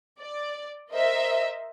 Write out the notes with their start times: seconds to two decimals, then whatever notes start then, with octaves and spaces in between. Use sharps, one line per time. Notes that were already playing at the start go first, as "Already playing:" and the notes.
0.20 D5
0.91 A#4 C5 D#5 E5